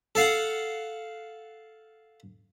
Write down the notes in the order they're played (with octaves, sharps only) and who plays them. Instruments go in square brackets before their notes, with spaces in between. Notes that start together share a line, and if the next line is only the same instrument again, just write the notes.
[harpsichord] A4 F5 F#5